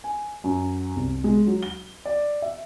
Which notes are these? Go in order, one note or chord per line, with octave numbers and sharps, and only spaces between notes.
G#5
F#2
C2
G#3
F#3
G7
D5
E5